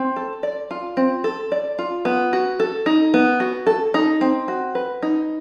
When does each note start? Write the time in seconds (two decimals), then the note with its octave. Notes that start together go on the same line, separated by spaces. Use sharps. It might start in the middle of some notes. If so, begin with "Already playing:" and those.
Already playing: C4
0.16 A4
0.43 D5
0.71 F4
0.97 C4
1.24 A4
1.52 D5
1.79 F4
2.05 B3
2.33 F#4
2.60 A4
2.86 D#4
3.14 B3
3.40 F#4
3.67 A4
3.94 D#4
4.21 C4
4.48 F#4
4.75 B4
5.03 D#4